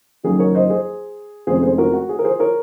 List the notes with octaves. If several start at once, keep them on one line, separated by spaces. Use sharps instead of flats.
F#1 F#2 D#3 F#3 G#4
A#4 C#5
C5 D#5
G#4 C5
F1 F2 D#3 G#3 C#4 G#4 C5
G#4 C5
F#4 A#4
F#4
G#4
A#4
G#4 C5
A#4 C#5